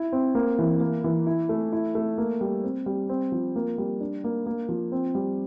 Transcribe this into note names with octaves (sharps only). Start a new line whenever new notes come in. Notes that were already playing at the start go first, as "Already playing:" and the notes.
Already playing: E4
C4
A#3
E3
A#3
E3
E4
A3
E4
A3
A#3
G3
C4
G3
C4
F3
A#3
G3
D4
A#3
A#3
F3
C4
G3